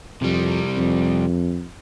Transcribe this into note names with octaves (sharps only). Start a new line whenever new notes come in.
F2 C3 G3
F2